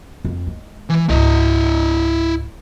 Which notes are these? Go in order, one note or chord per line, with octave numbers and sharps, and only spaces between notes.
F2
G#3
E3
C#2 G#2 E4 D#5